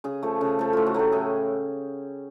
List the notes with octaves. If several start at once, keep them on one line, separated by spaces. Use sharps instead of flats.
C#3 G#4
F3 A3
C#3
F3 A3
A2 F4
F#4
F#3 A3 G4
A2 G#4